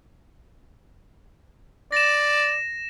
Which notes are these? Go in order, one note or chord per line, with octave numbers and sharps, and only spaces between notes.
D5 A#6 E7